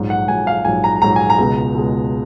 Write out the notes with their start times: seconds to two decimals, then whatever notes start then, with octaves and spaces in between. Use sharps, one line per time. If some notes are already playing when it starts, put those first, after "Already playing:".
Already playing: A#1 G#2 F#3
0.10 F#5
0.28 A#1 G#2 F#3 G#5
0.47 F5
0.65 A#1 G#2 F#3 G#5
0.84 A#5
1.02 A#1 G#2 F#3 A#5
1.16 G#5
1.30 A#5
1.38 C#2 B2 G#3
1.74 C#2 B2 G#3